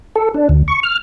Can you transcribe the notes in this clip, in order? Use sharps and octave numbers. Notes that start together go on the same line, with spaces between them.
A4
D4
D2
C#6
F6